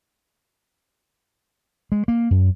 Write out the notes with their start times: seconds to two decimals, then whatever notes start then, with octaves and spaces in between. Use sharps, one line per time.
1.92 G#3
2.08 A#3
2.31 F#2